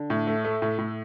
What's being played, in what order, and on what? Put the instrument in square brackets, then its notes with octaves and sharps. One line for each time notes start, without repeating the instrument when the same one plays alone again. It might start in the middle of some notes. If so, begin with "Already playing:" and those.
Already playing: [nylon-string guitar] D3
[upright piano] A2
A3
A3
A2
A2